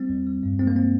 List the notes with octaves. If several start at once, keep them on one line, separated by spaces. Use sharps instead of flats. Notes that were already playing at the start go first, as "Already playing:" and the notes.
Already playing: G3 C4
E2
G3
G2
G#3 C4
A#3
C4